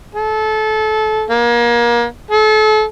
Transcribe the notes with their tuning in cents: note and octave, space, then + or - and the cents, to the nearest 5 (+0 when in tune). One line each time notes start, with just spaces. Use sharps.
A4 -25
A#3 +30
A4 -35